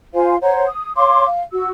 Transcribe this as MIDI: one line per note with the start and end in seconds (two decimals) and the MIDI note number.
0.14 0.36 65
0.14 0.36 72
0.14 0.36 77
0.14 0.36 80
0.42 0.66 72
0.42 0.66 73
0.42 0.66 78
0.42 0.66 82
0.67 0.93 87
0.97 1.25 73
0.97 1.25 77
0.97 1.25 84
0.97 1.25 86
1.27 1.43 77
1.53 1.71 66
1.53 1.71 88